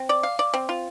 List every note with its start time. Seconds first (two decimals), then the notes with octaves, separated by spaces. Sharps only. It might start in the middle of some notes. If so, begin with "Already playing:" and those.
Already playing: C4
0.09 D5
0.23 F5
0.39 D5
0.54 C4
0.69 F4